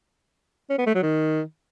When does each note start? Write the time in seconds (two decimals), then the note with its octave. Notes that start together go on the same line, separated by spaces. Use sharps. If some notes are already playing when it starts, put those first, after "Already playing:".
0.70 C#4
0.78 B3
0.86 A3
0.95 F#3
1.03 D#3